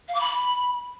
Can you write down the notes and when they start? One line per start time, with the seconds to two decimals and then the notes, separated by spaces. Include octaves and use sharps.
0.08 F5
0.14 D6
0.20 B5